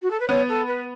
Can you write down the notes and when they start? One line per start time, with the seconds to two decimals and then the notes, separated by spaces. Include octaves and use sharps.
0.02 F#4
0.11 A4
0.20 B4
0.28 B3 C#5
0.49 A4
0.67 B4